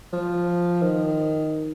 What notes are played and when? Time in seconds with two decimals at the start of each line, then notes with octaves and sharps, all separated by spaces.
0.13 F3
0.83 D#3